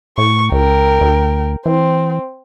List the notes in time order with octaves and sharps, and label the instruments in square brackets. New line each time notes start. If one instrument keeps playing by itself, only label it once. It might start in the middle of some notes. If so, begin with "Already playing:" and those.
[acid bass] A2 [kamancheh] C#6
[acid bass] C#2 [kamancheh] A#4 G5
[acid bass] D2
[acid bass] E3 [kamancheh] C4